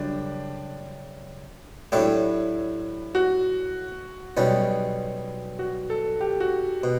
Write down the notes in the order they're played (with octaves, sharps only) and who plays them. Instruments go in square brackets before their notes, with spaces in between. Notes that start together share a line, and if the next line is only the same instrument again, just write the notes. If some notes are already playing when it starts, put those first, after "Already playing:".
Already playing: [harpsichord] F#2 C#3 G3 [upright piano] D4
[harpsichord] A2 F#3 A3 D4 G4 [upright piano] E4
[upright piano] F#4
[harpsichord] B1 B2 G3 C#4
[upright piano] F#4
A4
G4
F#4
[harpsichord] B2